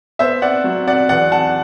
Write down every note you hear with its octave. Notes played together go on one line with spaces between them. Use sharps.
B3 C5 E5
D5 F#5
F#3
D5 F#5
E2 D5 F#5
F#5 A5